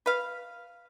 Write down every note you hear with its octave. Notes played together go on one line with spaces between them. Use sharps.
B4 F5